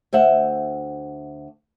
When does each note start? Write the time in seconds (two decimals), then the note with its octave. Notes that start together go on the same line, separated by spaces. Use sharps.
0.13 D2 C5 E5 F#5